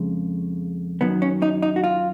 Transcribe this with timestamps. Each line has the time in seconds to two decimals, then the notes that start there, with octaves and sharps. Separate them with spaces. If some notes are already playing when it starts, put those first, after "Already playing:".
Already playing: F2 C#3 G#3
1.01 F#2 D#3 F#3 B3
1.22 C#4
1.42 D#4
1.62 D#4
1.76 F#4
1.84 F4